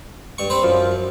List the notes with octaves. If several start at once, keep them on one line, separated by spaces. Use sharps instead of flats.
G2 C#6
C4 B4 C5
F#2 F3